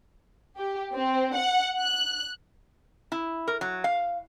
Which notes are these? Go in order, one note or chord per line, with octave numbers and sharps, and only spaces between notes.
G4
C4
F#5
F#6
E4
A#4
F#3
F5